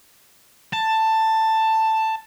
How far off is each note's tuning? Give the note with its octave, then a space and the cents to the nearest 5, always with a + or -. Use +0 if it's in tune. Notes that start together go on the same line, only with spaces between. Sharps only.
A5 +10